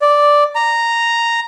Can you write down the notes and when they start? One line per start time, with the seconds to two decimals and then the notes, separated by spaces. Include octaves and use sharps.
0.02 D5
0.55 A#5